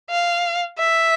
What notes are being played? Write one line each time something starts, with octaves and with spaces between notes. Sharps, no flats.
F5
E5